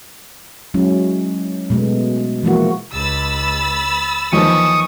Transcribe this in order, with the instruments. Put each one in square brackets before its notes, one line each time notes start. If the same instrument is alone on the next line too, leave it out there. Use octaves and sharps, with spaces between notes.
[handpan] F#3 G#3 C#4 E4
B2 G#3 A3 B3
E3 F3 G#3 A#3 E4 F#4
[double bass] C#2 [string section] B5 E6 A6
[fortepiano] D#2 F3 D#4 [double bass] E3 [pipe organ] C#6 D#6